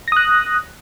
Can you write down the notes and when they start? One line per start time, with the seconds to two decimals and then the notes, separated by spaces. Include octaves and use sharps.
0.08 A#6
0.12 D#6
0.16 F#6